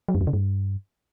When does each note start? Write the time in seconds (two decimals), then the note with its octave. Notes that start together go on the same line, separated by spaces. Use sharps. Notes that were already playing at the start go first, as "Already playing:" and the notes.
0.08 F#3
0.15 F#2
0.21 F2
0.27 C#3
0.33 G2